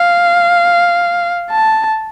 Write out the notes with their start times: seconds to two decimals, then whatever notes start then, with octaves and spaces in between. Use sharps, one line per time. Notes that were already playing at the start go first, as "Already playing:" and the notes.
Already playing: F5
1.50 A5